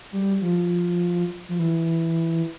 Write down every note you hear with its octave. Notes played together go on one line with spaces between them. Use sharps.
G3
F3
F3
E3